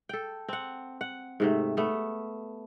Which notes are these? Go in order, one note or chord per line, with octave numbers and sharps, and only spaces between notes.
A4 G5
C4 F#5
F#5
G#2 C3 A3
A3 B3